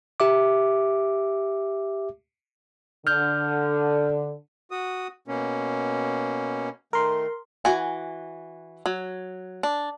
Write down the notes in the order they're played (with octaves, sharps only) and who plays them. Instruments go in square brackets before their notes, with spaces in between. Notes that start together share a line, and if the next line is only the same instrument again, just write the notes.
[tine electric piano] G4 E5 D6
[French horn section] D3 [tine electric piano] F6 G6
[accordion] F#4 D#6
B2 A#3 C#4
[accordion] D#3 A3 [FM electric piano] A#4 C6
[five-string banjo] E3 F#4 G#5
F#3
D4